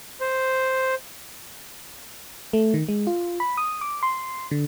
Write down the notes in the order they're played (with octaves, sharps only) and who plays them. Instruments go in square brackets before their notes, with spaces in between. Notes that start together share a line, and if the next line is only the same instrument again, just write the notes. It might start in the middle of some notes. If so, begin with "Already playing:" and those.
[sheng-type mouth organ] C5
[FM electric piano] A3
D#3
G#3
F4
B5
D#6
D6
C6
D3